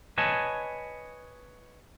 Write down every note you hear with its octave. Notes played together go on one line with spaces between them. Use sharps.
B4 C#5 D#5 G#5 A5